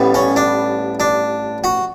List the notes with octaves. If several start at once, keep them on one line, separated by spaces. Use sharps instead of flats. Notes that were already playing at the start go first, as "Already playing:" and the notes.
Already playing: A1 A2 G3 B3
C#4
D4
D4
F#4